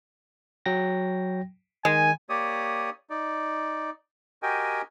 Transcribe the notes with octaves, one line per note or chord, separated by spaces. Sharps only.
F#3 G5 A#6
D#3 G#3 G#5
A#3 G4 C#5 D5 D#6
D#4 D5
F#4 G4 A#4 D#5 G5 G#5